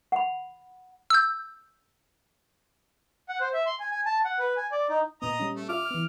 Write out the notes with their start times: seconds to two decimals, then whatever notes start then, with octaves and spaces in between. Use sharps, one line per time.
0.12 F#5 B5
1.10 E6 G6
3.29 F#5
3.41 C5
3.54 E5
3.66 C6
3.80 G#5
3.91 G#5
4.06 A5
4.25 F#5
4.39 B4
4.57 G#5
4.72 D5
4.90 D#4
5.22 A#2 B3 D#5 A#5
5.40 G3 C#4
5.56 A3
5.69 F4 E5 D6 F6
5.91 E3 B3